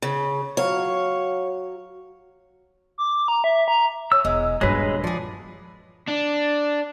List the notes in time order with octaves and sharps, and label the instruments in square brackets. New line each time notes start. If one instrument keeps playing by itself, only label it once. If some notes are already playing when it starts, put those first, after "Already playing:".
[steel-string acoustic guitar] C#3
[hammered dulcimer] F#3 F5 [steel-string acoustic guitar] C#5
[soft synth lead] D6
A#5
E5
A#5
[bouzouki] C#4 [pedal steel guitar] E6
[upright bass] E1 [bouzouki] G#3
[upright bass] D#1 G2 [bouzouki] F#3 [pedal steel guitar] G#3 B4
[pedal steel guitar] F3 [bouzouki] G#4 D5
[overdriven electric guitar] D4